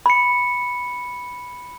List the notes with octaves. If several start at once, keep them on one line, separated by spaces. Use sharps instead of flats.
B5 C#7